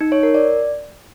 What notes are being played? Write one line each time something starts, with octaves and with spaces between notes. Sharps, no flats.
D#4
C#5
A#4
D5